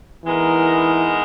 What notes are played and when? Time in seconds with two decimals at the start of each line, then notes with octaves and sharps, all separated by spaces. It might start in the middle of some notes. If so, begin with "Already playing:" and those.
0.25 E3 G#3 B3 D#4 A#4